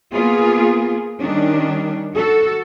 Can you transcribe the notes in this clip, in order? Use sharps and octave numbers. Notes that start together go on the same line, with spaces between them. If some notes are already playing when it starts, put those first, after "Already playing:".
A#3 B3 F4 G#4
D#3 G3 C#4 D4
F#4 A4